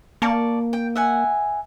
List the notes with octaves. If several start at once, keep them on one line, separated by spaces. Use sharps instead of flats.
A#3 D5 A5 C#6
G5
E5 F#5 G#5